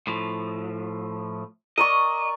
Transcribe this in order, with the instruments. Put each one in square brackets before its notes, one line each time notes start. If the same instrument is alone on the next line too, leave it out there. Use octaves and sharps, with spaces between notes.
[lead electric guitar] A2 F3
[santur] A#4 D5 C#6 [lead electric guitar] D#5